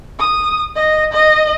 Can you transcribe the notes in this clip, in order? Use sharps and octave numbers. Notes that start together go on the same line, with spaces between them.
D#6
D#5
D#5